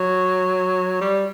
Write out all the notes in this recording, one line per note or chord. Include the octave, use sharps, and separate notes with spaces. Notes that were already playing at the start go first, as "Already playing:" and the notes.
Already playing: F#3
G3